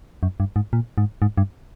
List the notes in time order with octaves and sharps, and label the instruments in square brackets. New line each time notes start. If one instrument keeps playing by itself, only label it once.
[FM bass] F#2
G2
G#2
A#2
G#2
G#2
G2